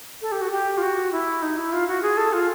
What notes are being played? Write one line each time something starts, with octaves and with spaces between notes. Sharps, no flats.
A4
G4
F#4
G4
F4
F#4
E4
D#4
E4
F4
F#4
G#4
A4
F4